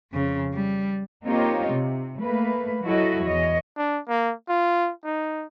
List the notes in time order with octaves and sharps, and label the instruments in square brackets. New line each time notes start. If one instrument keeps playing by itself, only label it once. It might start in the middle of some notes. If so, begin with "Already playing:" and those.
[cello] F2 C#3
G3
[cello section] A#3 C4 D#4 F4 G4 C#5
C3
A3 A#3 B4
F#3 E4 F#4 A4 D#5
E2 C#5 D#5
[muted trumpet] D4
A#3
F4
D#4